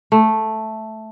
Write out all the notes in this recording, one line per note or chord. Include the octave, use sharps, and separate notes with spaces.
A3